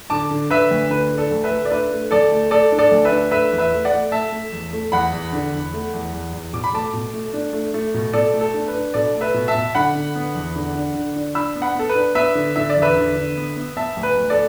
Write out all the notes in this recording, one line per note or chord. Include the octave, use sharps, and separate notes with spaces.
D3 A5 D6
D3
D3 B4 E5
D2
D3 B4
A3
A4 D5
D2
B4 E5
A3
D5
D4 B4 E5
A3
D2 A4 D5
A3
A3 A4 D5
D4
A4 D5
D2
B4 E5
D4
A3 B4 E5
E2
B4 E5
A3
D5 F#5
A3
A3 E5 A5
A3
E2
A3
E2 F#5 B5
E2
D3
E2
A3
E2
E2
E2
B2 D6
B5
A3 A5 D6
B2
A3
D4
A3
A3
B2
B2 A4 D5
A3
A4
D4
B4
D4
B2 A4 D5
A3
B4 E5
B2
E5 A5
B2
D3 F#5 B5
D3
B3
E2
D3
D4
D3
D4
D4 B5 E6
B3
F#5 B5
B3 A4
B4
D4
B3 B4 E5
D3
D3 E5
D5
E2
B4 E5
D3
D3
B3
B3
B3 E5 A5
D2
B4
D2
A4 D5